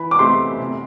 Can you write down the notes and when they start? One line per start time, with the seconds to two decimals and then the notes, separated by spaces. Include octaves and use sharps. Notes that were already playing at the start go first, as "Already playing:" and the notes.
Already playing: E3 B5
0.11 D6
0.19 A3 C4 G4 C6
0.60 C3